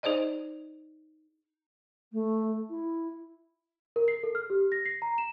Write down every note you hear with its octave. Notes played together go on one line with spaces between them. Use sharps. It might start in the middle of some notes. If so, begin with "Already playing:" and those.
D#4 G#4 C5 D5 D#5
A3
E4
A#4
C7
A4
F6
G4
A#6
C7
A#5
E7